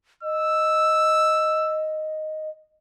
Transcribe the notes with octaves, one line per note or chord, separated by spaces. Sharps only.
D#5 E6